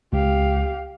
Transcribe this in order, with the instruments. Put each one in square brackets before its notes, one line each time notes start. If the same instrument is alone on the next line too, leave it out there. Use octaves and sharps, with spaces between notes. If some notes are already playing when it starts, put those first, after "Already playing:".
[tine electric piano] C#2 [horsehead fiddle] G4 F5